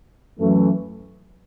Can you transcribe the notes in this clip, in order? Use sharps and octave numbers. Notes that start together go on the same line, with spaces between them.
F#2 E3 A3